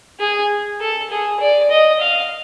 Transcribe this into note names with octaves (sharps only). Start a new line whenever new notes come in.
G#4
A4
G#4
D5
D#5
F5